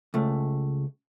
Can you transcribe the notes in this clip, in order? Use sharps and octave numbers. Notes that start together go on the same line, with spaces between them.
C#2 A3